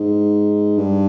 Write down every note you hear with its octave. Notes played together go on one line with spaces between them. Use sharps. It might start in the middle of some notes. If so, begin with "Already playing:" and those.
Already playing: G#2
G2